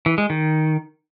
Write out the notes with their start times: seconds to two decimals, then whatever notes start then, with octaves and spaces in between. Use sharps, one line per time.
0.06 E3
0.18 G#3
0.30 D#3